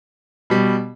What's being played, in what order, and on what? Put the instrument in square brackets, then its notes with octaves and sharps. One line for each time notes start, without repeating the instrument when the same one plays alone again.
[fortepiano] B2 G3